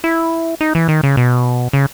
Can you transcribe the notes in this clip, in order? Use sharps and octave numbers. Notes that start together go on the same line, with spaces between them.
E4
D#4
E3
D#3
C#3
B2
C#3